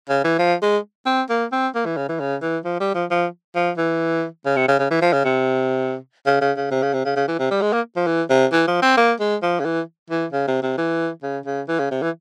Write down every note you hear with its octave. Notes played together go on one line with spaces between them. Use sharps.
C#3
E3
F3
G#3
C4
A#3
C4
A#3
E3
C#3
E3
C#3
E3
F3
G3
F3
F3
F3
E3
C#3
C3
C#3
C#3
E3
F3
C#3
C3
C#3
C#3
C#3
C3
C#3
C3
C#3
C#3
E3
C3
G3
G#3
A#3
F3
E3
C3
E3
F3
C4
A#3
G#3
F3
C#3
E3
E3
C#3
C3
C3
E3
C#3
C#3
E3
C#3
C3
E3